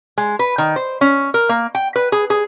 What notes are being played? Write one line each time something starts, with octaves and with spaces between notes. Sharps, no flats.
G#3
B4
D#3
C5
C#4
A#4
A#3
G5
B4
G#4
G#4